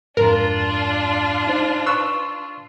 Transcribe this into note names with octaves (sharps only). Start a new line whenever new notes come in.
F2 G#2 D4 F4 A#4
D#4 C5
B4 C#6 E6